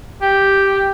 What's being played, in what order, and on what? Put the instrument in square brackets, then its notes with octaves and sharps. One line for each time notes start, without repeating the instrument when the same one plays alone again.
[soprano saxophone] G4